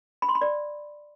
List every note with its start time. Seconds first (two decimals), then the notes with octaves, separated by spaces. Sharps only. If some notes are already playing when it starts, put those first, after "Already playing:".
0.22 B5
0.29 C6
0.35 B5
0.41 D5